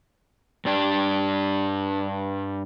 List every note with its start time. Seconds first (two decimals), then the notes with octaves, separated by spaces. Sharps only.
0.65 G2 D4 G5